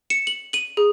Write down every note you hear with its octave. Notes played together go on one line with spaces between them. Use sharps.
C#7 E7
F#7
D#7 F#7
G#4